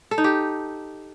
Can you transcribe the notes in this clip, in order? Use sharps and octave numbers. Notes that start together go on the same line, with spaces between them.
A4
D#4
G4